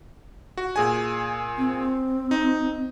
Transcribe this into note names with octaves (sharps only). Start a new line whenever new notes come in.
F#4
A#2 G#4 G#5
C4
D#4